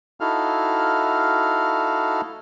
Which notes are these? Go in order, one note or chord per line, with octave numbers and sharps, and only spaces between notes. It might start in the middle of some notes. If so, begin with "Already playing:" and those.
D#4 E4 F#4 A4 F5 F6